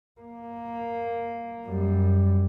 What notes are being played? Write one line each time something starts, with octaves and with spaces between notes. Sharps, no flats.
A#3
F#2 G3